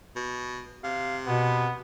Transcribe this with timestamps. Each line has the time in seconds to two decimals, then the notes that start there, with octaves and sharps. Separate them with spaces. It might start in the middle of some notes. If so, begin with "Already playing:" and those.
0.16 B2
0.84 C3 F5
1.26 B2 B3